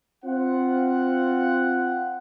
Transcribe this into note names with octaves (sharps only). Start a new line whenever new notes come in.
C4 F4 F#5